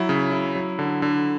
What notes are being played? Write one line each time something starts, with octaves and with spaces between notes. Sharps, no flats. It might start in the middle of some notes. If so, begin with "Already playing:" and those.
Already playing: F#3 E4
C#3
E4
F#3
D3
D3